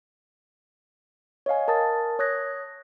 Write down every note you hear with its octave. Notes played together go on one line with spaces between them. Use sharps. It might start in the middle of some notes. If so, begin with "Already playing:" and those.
C#5 D#5 F5 G#5
A#4 A5 D#6 A6
C#5 D#6 F#6 G#6 A#6